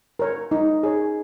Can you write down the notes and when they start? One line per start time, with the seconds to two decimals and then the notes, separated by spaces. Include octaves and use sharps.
0.19 A#4 C#5
0.51 D#4
0.83 G#4 C#5